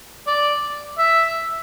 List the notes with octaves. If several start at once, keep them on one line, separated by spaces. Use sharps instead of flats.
D5
E5